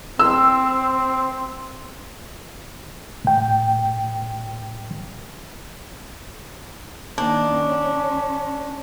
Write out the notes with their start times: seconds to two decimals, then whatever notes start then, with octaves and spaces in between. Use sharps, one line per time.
0.19 C4 E6
3.25 A2 G5
7.18 D#3 A#3 D4
7.52 C#4